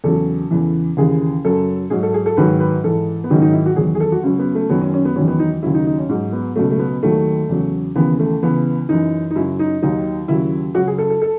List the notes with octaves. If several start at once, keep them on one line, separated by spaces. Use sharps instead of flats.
E2 C#3 F#3 A4
E2 C#3 E3
D#2 C#3 E3 G#4
F#2 C#3 F#3 A4
G#2 F#3 G#4
A4
G#4
A4
G#2 D#3 F#3 B4
B4
G#2 E3 A4
B3
G#2 D#3 F#3 C#4
D#4
E4
F#4
E2 D#3 F#3 G#4
G#4
A4
F#4
C#2 C#3 F#3
B3
A3
F#2 D#3 F#3 B3
C#4
C#4
B3
E2 D#3 F#3 C#4
B3
D#4
D#2 C#3 F#3 E4
D#4
D#4
C#4
G#2 F#3
B3
C#2 B2 F#3 A3
A3
B3
D#2 D#3 F#3 A3
E2 C#3 F#3
D#2 C#3 E3 B3
A3
C#2 C#3 E3 B3
F#2 E3 D#4
D#4
F#2 C#3 F#3 E4
D#4
D#2 D#3 F#3 D#4
D#2 C#3 F#3 E4
C#2 C#3 F#3 F#4
G#4
A4
A4
A4